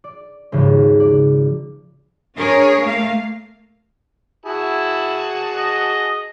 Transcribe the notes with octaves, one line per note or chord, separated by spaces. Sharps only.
D5
G#1 D#2 C#3 F3
D5
D4 G#4 A#4 C#5
A3 A#3 F5
E4 F#4 G#4 A5
D#5